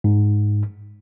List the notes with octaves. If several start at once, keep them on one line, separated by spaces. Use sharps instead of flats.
G#2